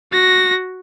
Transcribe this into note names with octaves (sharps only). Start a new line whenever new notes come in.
F#4 A#6